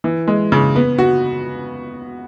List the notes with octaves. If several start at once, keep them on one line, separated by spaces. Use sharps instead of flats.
E3
G#3
C#3
B3
F#4